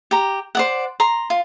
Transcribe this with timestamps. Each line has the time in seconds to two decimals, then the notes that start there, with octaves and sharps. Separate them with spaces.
0.11 G4 A#5
0.55 C5 D5 F#5
1.00 A#5 C6
1.30 F4